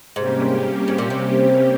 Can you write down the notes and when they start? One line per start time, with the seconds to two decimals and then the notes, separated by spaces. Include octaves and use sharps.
0.16 G#2 C3 G3 A#3 C#4 G4
0.88 G#2
0.98 A#2
1.10 C3